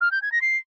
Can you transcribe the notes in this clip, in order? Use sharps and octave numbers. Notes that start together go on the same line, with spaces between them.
F6
G6
G#6
A#6
C7